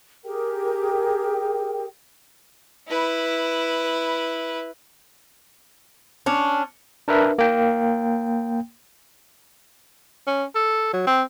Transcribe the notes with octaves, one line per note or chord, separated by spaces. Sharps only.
G4 G#4 A#4 G5
E4 B4
C#4 D4
D4 A#4 B4 E5
A#3 G5
C#4
A4
F#3
C4